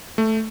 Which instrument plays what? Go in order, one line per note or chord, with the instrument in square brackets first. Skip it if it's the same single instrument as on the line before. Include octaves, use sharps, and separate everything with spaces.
[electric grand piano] A3